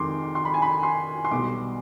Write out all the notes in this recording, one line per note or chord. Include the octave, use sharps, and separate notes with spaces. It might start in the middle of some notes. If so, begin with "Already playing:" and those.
Already playing: F2 D#3 G#3 C6 D6
C6
B5
G#5
B5
C6
C6
B1 B2 G3 D6